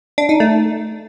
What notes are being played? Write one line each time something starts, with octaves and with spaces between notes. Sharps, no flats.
D4
D#4
A3